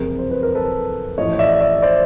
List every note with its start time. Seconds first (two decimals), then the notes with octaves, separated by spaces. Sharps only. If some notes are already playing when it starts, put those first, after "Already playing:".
Already playing: F#1 F2 C3 G#4 A#4
0.19 C5
0.31 B4
0.43 A#4
0.55 A4 B4
1.17 A1 A2 F3 A3 C#5 D#5
1.39 D5 E5
1.60 D5 E5
1.82 C5 D5